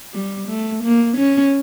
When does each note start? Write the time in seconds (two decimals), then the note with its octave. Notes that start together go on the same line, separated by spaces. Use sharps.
0.13 G3
0.48 A3
0.83 A#3
1.17 C#4